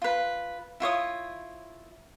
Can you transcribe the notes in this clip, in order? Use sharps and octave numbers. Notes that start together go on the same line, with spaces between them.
F4 B4
E4 F4 C#5 D#6